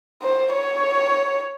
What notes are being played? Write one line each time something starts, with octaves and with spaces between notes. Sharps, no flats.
C5
C#5